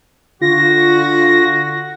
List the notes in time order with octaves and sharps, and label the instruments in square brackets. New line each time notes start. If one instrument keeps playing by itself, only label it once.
[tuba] D3 [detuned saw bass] F4 [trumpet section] F#4 [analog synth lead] A#6